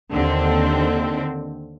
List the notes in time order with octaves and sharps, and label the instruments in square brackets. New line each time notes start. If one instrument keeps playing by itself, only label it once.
[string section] D#2 D3 C4